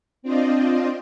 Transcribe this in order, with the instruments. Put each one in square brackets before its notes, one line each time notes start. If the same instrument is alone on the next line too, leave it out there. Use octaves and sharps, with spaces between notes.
[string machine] C4 D4 F4 C5 D5 D#5